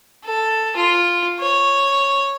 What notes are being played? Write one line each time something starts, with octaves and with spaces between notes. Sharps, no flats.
A4
F4
C#5